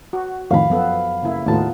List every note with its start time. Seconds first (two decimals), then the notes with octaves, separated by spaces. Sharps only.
0.13 F#4
0.51 F2 A2 D#3 F5 B5
0.70 F#2 F3 B3 A4
1.23 C#3 A#3 E4
1.46 D#2 A2 B3 D#4 F4 A5